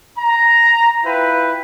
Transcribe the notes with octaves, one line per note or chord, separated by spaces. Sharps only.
A#5
E4 F4 B4 G5